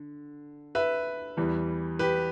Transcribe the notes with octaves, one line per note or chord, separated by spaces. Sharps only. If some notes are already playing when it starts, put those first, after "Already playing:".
Already playing: D3
B4 E5
E2 E3 G3
G4 B4